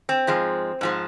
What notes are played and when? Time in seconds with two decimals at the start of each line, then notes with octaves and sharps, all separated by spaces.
0.09 C4
0.27 G#2 F3 G#3
0.81 G#2 F3 G#3